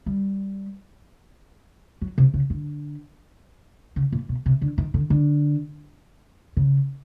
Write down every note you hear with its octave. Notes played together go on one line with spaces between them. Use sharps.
G3
F#3
C3
C#3
D3
C#3
A#2
B2
C3
D3
D#3
D3
D3
C#3